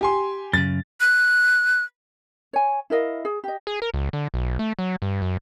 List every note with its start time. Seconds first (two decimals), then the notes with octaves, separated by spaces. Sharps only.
0.01 G4 G#5 C6
0.53 F#2 C#3 A6
1.00 F#6
2.53 C#5 G#5
2.90 E4 A#4 D#5 F5
3.25 G#4
3.44 G4 D#5
3.67 G#4
3.82 A#4
3.94 C#2
4.13 D3
4.34 B1
4.59 A3
4.79 F#3
5.02 G2
5.22 F#2